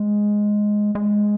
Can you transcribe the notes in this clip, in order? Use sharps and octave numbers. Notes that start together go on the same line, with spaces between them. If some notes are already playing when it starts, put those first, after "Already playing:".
Already playing: G#3
G#3